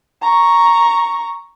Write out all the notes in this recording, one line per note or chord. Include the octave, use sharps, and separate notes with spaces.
A#5 C#6